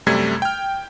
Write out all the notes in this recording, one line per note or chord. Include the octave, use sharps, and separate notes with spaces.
F#2 C3 G3 A3 G#6
G5 F6